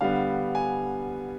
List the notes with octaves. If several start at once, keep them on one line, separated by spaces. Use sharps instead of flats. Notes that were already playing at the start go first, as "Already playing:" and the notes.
D3 G3 B3 F5
G#5